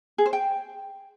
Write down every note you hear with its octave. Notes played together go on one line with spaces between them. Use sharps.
G#4
C5
G5